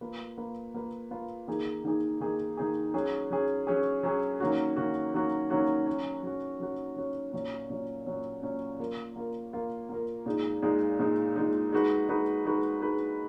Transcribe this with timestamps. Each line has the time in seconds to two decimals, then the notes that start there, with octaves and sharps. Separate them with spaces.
0.01 A#3 F4 B4
0.37 A#3 F4 B4
0.74 A#3 F4 B4
1.11 A#3 F4 B4
1.47 D#3 A#3 D#4 G#4
1.84 D#3 A#3 D#4 G#4
2.20 D#3 A#3 D#4 G#4
2.57 D#3 A#3 D#4 G#4
2.94 F#3 C#4 G#4
3.31 F#3 C#4 G#4
3.67 F#3 C#4 G#4
4.03 F#3 C#4 G#4
4.40 D#3 F#3 A#3 C#4 F#4
4.77 D#3 F#3 A#3 C#4 F#4
5.14 D#3 F#3 A#3 C#4 F#4
5.50 D#3 F#3 A#3 C#4 F#4
5.87 F#3 C#4 F#4
6.23 F#3 C#4 F#4
6.60 F#3 C#4 F#4
6.96 F#3 C#4 F#4
7.33 A#2 F#3 C#4
7.70 A#2 F#3 C#4
8.06 A#2 F#3 C#4
8.43 A#2 F#3 C#4
8.80 A#3 F4 A#4
9.16 A#3 F4 A#4
9.53 A#3 F4 A#4
9.89 A#3 F4 A#4
10.26 A#2 G#3 D#4
10.62 A#2 G#3 D#4
10.99 A#2 G#3 D#4
11.36 A#2 G#3 D#4
11.72 G#3 D#4 F#4 B4
12.09 G#3 D#4 F#4 B4
12.45 G#3 D#4 F#4 B4
12.82 G#3 D#4 F#4 B4